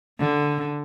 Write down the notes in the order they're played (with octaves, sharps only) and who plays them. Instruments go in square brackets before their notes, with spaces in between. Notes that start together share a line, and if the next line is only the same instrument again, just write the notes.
[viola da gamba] D3